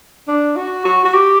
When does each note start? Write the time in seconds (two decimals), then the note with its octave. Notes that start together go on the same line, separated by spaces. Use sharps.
0.28 D4
0.56 F#4
0.85 F#4
1.05 F#4
1.14 G4